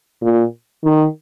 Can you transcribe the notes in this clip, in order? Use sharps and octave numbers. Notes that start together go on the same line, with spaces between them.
A#2
D#3